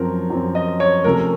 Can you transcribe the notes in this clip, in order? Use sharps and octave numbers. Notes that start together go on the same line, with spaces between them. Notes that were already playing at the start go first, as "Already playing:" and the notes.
Already playing: F#2 F3 C4 A#4
F#2 F3 C4
D#5
C#5
C3 F3 A3 C#4 A#4